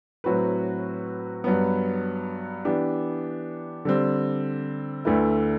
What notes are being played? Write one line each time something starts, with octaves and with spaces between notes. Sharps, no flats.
A2 F#3 C4 F#4 B4
G2 F#3 B3
E3 B3 D4 G4
D3 G3 C4
D2 D3 A3 E4 B4